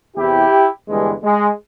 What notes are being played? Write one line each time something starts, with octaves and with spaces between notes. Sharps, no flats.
E2 C3 E3 E4 G4
G1 G2 E3 G#3
G#3